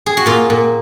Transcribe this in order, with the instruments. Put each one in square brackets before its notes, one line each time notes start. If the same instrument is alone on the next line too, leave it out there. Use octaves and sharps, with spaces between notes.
[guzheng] G#4
F#4
A#2 F4
A#2